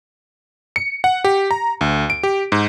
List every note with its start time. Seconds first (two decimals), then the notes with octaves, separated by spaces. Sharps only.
0.76 C#7
1.04 F#5
1.24 G4
1.51 A#5
1.81 D2
2.10 D7
2.23 G4
2.52 G#2